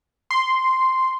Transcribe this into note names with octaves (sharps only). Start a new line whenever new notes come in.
C6